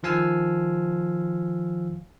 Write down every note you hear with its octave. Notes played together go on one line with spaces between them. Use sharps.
D#3 F3 F5 G#5 E6 F6